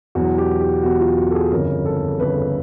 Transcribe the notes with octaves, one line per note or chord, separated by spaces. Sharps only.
E2 B2 F#3 F#4
G4
G4
E2 B2 F#3 F#4
F4
F#4
A4
G#4
G1 F2 C#3 A#4
A4
G1 F2 C#3 B4